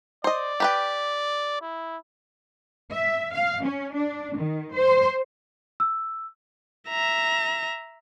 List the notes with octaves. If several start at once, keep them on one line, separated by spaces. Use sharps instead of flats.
C5 D5 D#5
G4 B4 G5
E4
E5
F5
C#4
D4
D#3
C5
E6
E5 A#5